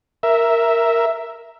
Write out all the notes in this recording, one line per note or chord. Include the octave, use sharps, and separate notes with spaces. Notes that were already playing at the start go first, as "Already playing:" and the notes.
A#4 E5